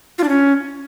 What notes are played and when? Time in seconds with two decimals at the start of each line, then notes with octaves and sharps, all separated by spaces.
0.18 F4
0.24 D4
0.29 C#4